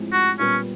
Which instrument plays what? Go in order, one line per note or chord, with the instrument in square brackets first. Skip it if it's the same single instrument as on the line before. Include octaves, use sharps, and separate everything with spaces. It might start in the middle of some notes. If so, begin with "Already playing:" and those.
Already playing: [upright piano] A2 F3 G#3 C4
[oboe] F#4
[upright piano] A#2 G3 B3 [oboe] C#4